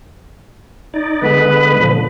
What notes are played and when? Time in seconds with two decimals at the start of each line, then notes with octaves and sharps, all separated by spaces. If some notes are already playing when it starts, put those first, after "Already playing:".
0.94 D#4 D5
1.22 D3 G#3 B3 B4
1.80 A#2 D3 F3